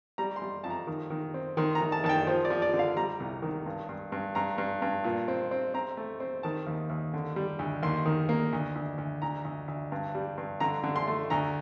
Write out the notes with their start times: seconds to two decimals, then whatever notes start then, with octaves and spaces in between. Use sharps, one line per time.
0.18 G3 A#5
0.36 C6
0.42 G3
0.64 F2 A5
0.70 A#5
0.87 D#3
1.10 D#3
1.34 C4
1.57 D#3 C6
1.75 A#5
1.81 D#3
1.92 A5
2.04 D#3 A5
2.09 G5
2.27 F3 C5
2.45 D5
2.50 F3
2.62 D5
2.74 D3
2.79 F5
2.97 G3 A#5
3.20 C2
3.42 D#3
3.66 G2
3.89 G2
4.12 G2
4.35 G2 A#5
4.58 G2
4.82 G2
5.04 A#2
5.28 C4
5.51 C4
5.74 C4 A#5
5.97 A3
6.20 C4
6.43 D#3 A5
6.67 D#2
6.90 D#2
7.14 D3
7.36 G3
7.59 D2
7.83 D#2 C6
8.05 D#3
8.29 A#3
8.53 D2
8.76 D2
8.98 D2
9.22 D2 A#5
9.45 D2
9.68 D2
9.92 G2
10.15 G3
10.38 G2
10.60 D3 A#5
10.84 D3
10.96 C6
11.08 A3
11.30 D2 A#5